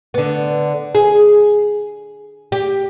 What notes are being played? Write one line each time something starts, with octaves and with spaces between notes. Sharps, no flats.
D3 B3
G#4
G4